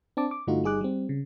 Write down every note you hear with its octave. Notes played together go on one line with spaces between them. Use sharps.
C4 D4 A5 D6
D6
G2 D3 A3 D#4 F4 F#4
G1 G3 D#4 G#4 D6 F#6
G3 C4
C#3